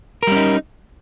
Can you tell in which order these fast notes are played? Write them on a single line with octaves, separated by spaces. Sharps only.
A#4 G3 C#4 D#4